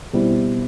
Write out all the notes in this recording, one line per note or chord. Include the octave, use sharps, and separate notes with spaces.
B2 G3 C4 E4